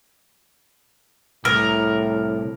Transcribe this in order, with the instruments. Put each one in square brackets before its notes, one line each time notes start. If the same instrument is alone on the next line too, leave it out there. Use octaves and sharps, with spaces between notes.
[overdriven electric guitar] C2 [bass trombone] A2 [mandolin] A#4